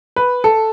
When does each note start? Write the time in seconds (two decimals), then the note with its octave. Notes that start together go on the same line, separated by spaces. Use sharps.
0.16 B4
0.44 A4